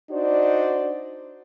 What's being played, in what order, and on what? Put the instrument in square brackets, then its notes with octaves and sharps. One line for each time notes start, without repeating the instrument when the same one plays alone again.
[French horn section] D4 D#4 F#4 C5 D5